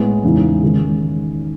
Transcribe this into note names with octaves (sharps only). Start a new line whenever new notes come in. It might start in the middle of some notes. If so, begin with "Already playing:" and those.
Already playing: A2 G#3 B3
E2 C#3 E3 G#3 D#4
D#3 G#3 C#4